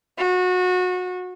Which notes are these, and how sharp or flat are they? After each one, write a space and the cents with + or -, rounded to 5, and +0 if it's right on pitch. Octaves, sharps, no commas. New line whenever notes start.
F#4 -25